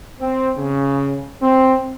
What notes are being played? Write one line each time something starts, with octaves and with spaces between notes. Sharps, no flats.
C4
C#3
C4